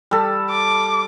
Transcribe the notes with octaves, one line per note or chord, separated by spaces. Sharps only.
G3 A4
D6